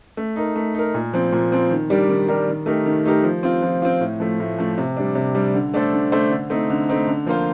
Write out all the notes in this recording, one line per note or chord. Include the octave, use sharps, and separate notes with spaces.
A3
D#4 A#4
A3
D#4 A#4
A#2
F3 C4
A#2
F3 C4
D#3
G3 D4 G4 A#4
D#3
G3 D4 G4 A#4
D#3
A3 D#4 G4 A#4
D#3
A3 D#4 G4 A#4
F3
C4 F4
F3
C4 F4
A2
F3 A3
A2
F3 A3
C3
G3 D4
C3
G3 D4
D3
A3 D4 A4 C5
D3
A3 D4 A4 C5
D3
A3 C4 D#4
D3
A3 C4 D#4
D3
F3 A#3 F4 C5